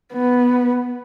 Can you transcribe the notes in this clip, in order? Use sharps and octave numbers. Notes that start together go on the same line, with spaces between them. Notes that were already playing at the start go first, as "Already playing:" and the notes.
B3